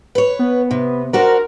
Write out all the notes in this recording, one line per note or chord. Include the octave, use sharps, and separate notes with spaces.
B4 C#5
B3
C3
D4 F#4 A#4 C5